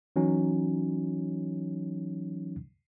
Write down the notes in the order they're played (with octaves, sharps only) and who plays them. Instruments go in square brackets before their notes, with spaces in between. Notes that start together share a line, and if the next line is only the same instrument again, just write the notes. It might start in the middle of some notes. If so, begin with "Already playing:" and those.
[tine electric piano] E3 F#3 C#4 D#4